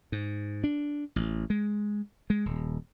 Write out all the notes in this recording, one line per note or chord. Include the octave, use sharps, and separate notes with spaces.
G#2
D4
A1
G#3
G#3
D#1